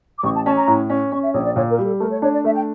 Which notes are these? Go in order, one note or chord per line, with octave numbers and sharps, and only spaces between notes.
D6
A1 C#6
A5
C#4 A5
A#5
A2
C#4
C#4 C#6
E5
A#1 C#5
D5
A#2 C#5
A#4
G3
A4
A3 A#4
C#5
D4 C#5
D5
A3 E5
G5